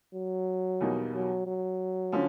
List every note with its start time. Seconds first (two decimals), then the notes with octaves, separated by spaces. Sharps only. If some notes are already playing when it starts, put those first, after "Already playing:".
0.14 F#3
0.81 E2 B2 G3 A#3 D#4
1.14 F#3
1.47 F#3
2.12 D3 F3 C#4